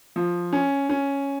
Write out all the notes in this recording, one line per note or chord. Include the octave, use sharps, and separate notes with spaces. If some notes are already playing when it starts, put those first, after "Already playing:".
F3
C#4
C#4